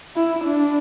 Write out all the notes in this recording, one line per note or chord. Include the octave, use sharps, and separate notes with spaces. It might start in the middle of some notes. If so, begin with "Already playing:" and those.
E4
D4